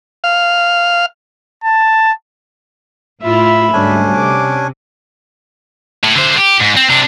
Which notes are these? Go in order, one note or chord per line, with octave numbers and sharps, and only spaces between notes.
F5
A5
A2 E4 F4 E5 B5
D2 G#2 G3 C#4 D4 G#5
C3 D6
A2
D3 C5
G4
G#2
C4
C3 D4